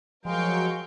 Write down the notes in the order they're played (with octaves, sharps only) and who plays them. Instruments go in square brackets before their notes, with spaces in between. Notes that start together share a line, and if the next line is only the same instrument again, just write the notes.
[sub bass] F3 [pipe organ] F#3 G5 [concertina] G#3 [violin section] A#4 F5 C#6